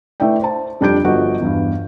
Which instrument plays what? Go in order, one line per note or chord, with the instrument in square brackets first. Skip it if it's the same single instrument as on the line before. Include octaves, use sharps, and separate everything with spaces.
[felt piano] A3 E4 B4 D5 G5
C5 A5
F2 G3 D4 G4 G6 D7
G1 F3 F#4 D#5 F#5
E2 G2